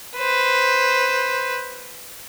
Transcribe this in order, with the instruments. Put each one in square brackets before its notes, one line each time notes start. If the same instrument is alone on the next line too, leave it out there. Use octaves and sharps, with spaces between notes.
[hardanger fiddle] B4 C5